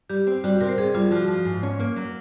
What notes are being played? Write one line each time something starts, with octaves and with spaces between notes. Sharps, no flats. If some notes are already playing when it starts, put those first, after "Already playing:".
G3 G4
C4
G3 F#4
C3 A#4
C5
C3 G#4
G3 F4
F3 F#4
F3
G#2
C#4
A#3
F#3